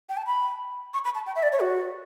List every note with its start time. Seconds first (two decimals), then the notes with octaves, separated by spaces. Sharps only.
0.09 G5
0.17 A5
0.26 B5
0.94 C#6
1.05 B5
1.15 A5
1.26 G5
1.36 E5
1.43 D5
1.52 C#5
1.60 F#4